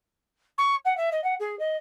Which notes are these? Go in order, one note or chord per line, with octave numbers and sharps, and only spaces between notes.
C#6
F#5
E5
D#5
F#5
G#4
D#5